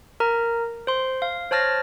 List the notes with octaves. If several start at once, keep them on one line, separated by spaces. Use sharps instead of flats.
A#4 A#5
C5 C6
F5
C5 C#5 A5 F6 A6 A#6